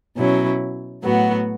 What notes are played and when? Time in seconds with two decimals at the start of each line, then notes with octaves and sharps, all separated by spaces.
0.16 B2 F#3 C#4 E4
1.03 A2 F#3 B3 F#4